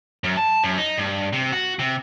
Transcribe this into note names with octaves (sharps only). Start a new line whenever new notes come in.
F#2
A5
F#2
D#4
G2
C3
F#4
C3